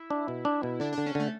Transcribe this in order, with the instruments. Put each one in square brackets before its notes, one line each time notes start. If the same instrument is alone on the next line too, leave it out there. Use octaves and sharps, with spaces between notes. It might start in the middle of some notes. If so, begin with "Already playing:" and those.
Already playing: [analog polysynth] E4
[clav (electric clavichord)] D4
B2
D4
B2
[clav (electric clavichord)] D3 [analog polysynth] D4
[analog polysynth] D4
[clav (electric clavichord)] D3
[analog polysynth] C#4
[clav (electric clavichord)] D3 [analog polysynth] A3